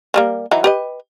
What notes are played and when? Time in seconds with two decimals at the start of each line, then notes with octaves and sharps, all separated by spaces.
0.14 F3 G3 A#3
0.51 E3 F#3 D#4
0.64 G4 B4 D#5